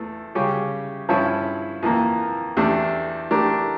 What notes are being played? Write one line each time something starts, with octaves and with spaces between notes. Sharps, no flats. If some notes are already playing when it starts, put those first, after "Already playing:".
Already playing: E2 E3 A3
C#3 G3 C#4 G4
G2 F3 C#4 E4
F2 E3 A#3
E2 E3 A3 D4 G4
E3 A3 D4 G4 A#4